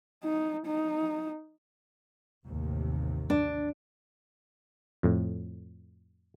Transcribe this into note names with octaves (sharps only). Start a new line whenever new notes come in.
D#4
D#4
A1 D#2 C3
D4
F2 A2